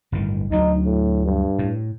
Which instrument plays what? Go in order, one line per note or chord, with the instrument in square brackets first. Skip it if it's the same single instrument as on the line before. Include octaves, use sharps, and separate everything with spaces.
[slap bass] G1 A2 D#3
[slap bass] D2 F#3 [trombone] D#4
[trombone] A2
G2
[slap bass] A2